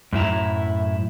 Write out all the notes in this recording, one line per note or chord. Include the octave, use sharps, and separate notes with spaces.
F#2 A2 E4 A#5